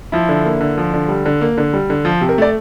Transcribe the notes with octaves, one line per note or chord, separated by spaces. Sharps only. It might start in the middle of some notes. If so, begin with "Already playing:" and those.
F3 E4
D3
A#3
D3
F3
D3
G3
D3
A#3
D3
G3
D3
F3
C3
A#4
A3 D5